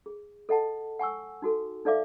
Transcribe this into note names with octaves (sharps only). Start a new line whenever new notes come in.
G#4
A4 D#5 F#5 A5
F#5 G#5 C#6 E6
D#4 F#4 A4
D#4 A4 D5 E5 F5 D6